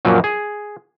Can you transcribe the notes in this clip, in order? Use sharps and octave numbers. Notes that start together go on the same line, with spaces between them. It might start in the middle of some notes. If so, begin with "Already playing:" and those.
F#2 A#2 F3 F#3
G#4